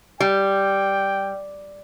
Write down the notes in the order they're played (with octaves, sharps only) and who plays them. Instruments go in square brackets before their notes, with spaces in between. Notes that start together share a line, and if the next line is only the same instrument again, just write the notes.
[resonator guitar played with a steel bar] G3 [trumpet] G5